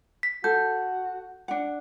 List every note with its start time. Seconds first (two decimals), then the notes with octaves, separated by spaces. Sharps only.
0.23 B6
0.44 F#4 A4 G6
1.48 D4 F#5